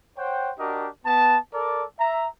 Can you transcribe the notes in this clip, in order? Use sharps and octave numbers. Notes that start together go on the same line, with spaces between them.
C5 C#5 F#5 G5
D4 F#4 G4 A#4 D#5
B3 A5
A4 A#4 D5
E5 A#5